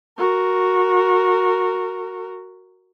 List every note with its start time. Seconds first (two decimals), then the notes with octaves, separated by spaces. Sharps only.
0.18 F#4 A#4